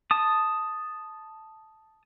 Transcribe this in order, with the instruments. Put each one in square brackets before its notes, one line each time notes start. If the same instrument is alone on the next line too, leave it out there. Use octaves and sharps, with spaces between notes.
[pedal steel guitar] A5 D#6